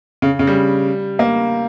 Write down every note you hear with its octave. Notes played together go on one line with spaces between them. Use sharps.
C#3
C#3
G3
A#3